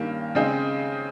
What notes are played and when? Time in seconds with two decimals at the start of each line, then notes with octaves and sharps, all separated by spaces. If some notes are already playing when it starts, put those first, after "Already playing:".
Already playing: G2 D#3 A#3 C#4 G4
0.35 C#3 G#3 C4 D#4